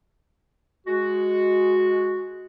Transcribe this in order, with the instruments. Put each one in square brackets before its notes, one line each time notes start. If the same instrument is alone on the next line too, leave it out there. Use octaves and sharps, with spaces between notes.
[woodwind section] G#3 F#4